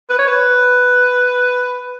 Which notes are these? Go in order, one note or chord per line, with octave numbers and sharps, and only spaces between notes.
B4
C#5
B4